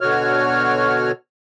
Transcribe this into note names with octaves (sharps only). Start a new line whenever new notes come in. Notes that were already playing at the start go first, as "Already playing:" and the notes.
B2 D3 F#4 C#5 F6